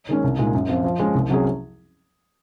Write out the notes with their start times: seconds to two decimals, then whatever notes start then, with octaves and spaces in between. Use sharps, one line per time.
0.09 D#3 G#3 C#4
0.24 C2
0.38 A#2 G#3 D#4 G#4
0.54 F#2
0.69 F3 C4 F4
0.84 F3
0.99 G#3 C#4
1.15 C2
1.29 C3 F#3 C#4 G#4